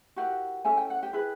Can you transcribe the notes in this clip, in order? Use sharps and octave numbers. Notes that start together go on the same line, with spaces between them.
E4 F#4 G4 A#4 F#5
C#4 E4 A4 G#5
G5
F#5
G4 G5
E4 G#4 B4